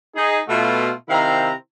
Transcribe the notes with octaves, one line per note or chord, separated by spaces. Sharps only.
D#4 G#4
B2 A3 F4
C3 D#3 C4 E4 F5 A#5